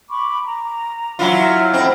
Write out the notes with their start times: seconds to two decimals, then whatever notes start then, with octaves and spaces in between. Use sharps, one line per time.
0.10 B5 C#6 D6
0.46 A#5
1.19 F#3 E4 F4 E5 F#5
1.73 A2 C4 D#5 F#5 B5